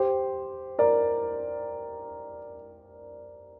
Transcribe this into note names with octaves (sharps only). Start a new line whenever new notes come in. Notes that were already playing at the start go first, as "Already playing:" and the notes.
Already playing: G4 C5
A#4 D5